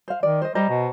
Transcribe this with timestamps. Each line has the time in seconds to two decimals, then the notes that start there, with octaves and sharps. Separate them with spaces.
0.08 C5 F5
0.23 D#3 D5
0.42 C5 D#5
0.55 G3 C5 D#5 A#5
0.69 B2